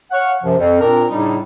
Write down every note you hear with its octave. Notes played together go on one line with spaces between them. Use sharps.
C#5 F5 F#5
F#2 C3 F3
F2
A#2 C4 D4 A#4
A2 C#3 G3 D4 D#4